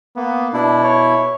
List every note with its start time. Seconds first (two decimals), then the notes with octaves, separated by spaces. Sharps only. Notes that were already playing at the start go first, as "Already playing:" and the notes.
0.16 A#3 B3
0.53 B2 D4 E4
0.84 C#5